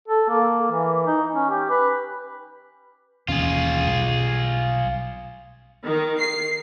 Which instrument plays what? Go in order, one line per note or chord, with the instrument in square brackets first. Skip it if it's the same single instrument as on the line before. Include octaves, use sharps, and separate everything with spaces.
[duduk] A4
A#3
E3
D#4
C#4
G4
B4
[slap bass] E1 D#2 C#4 [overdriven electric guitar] F4 G#4
[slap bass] B1 G3
[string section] D#3
C7